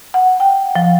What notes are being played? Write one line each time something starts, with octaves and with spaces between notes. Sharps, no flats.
F#5
G5
F3